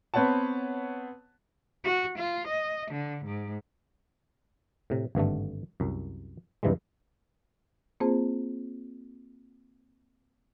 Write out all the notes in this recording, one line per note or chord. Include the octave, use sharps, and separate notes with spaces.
B3 C4 B4 C#5 F#5 A5
F#4
F4
D#5
D3
G#2
A2 C3
G#1 G2 D3 A3
C2 F#2
C#2 G2 C3 E3 G3 G#3
A#3 C4 F4 G#4 C5 A5